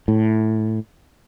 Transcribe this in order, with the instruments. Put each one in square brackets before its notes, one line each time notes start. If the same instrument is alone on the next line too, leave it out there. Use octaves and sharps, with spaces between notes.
[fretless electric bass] A2